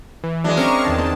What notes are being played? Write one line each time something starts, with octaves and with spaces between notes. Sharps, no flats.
E3
F#3 G#3 D4 E5
C4 C#4 A#4 A#5 C#6 F6
E2 D#3 A5
C4